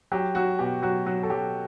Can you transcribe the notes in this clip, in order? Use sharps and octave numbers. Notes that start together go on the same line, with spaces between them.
F#3 G4
F#3 F#4
B2 G4
F#3 F#4
F#3 F#4
A4
F#3 G4